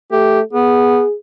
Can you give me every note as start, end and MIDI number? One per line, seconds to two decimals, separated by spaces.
0.12 0.42 57
0.12 0.40 67
0.53 1.02 59
0.53 1.15 68